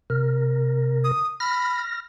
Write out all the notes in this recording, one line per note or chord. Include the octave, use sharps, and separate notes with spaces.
C3 A#4
D#6
B5 F6 A#6